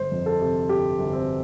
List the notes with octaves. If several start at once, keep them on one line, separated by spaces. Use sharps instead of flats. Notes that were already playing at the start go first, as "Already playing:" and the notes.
Already playing: G1 C5
F2
A4
C3
G1 G4
G1
C4